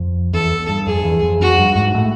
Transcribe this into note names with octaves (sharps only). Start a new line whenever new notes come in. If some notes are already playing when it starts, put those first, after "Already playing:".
Already playing: F2
E2 A4
G2
F2 G#4
E2
F2
F2 F#4
G2
G#2
A2